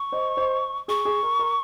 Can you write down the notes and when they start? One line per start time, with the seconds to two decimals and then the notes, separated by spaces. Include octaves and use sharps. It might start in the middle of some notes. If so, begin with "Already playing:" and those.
Already playing: C#6
0.12 C5 D#5
0.37 C5 D#5
0.88 G#4 C#6
1.05 G#4
1.23 A#4
1.39 A#4